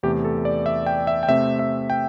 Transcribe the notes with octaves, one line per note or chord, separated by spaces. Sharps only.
E2 C3 A3 G4
A4
D5
E5
G5
E5
G5
C3 A3 C4 E5
E5
G5